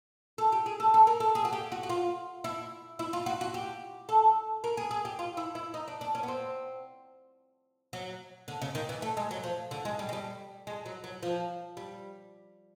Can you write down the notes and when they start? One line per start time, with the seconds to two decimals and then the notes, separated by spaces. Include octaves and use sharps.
0.38 A4
0.52 G4
0.66 G#4
0.80 A4
0.94 A4
1.07 A#4
1.20 A4
1.35 G#4
1.45 F#4
1.53 G4
1.72 F#4
1.83 F#4
1.89 F4
2.44 E4
2.99 E4
3.13 F4
3.26 F#4
3.41 F#4
3.54 G4
4.09 A4
4.64 A#4
4.77 G#4
4.91 G#4
5.05 G4
5.19 F4
5.37 E4
5.55 E4
5.74 D#4
5.88 D4
6.01 D4
6.15 C#4
6.23 B3
6.28 C4
7.93 F#3
8.48 D3
8.62 C#3
8.75 D#3
8.89 E3
9.02 A3
9.17 G#3
9.31 F#3
9.44 F3
9.71 D3
9.85 G#3
9.99 G3
10.09 G#3
10.13 G3
10.67 G#3
10.86 F#3
11.04 F#3
11.23 F3
11.77 G3